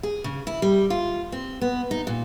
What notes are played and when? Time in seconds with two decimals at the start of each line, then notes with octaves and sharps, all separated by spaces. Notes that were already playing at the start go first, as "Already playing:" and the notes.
0.03 G#4
0.24 C#3
0.47 E4
0.62 G3
0.90 F4
1.32 C4
1.61 B3
1.91 D#4
2.07 A#2